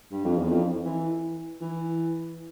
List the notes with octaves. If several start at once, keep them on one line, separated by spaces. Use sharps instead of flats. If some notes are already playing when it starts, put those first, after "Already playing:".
G2
F2
E2
F2
E3
E3